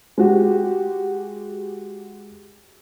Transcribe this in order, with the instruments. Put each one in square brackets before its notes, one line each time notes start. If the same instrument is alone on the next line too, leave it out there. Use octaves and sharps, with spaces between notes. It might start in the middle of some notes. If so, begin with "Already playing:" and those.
[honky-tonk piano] G#3 F#4 G4